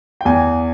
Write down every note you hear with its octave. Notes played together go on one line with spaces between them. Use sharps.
G5
E2 G#5